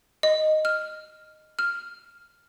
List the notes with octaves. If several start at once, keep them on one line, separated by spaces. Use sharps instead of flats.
D#5
F6
F6